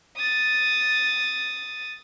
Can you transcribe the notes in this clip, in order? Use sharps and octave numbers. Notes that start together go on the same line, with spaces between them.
D#6 A6